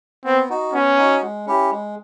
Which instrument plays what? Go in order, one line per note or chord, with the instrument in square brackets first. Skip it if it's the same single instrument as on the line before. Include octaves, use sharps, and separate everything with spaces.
[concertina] B3 [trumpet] C4
[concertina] D#4 F#4
[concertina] B3 [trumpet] C#4
[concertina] D#4 F#4
G#3
C#4 E4 G4
G#3